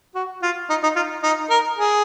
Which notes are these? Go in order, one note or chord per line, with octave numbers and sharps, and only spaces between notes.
F#4
F4
D#4
D#4
F4
D#4
A#4
G#4